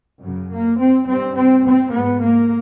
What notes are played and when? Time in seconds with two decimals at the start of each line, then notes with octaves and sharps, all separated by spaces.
0.22 F#2 C#3
0.51 A#3
0.80 C4
1.08 G2 C4
1.37 C4
1.66 C4
1.93 G#2 B3
2.22 A#3